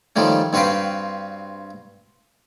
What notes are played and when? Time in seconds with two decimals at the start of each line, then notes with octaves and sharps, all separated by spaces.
0.16 D#3 F3 G3 A3 C#4
0.53 G2 C4 F#4 B4 F5 G5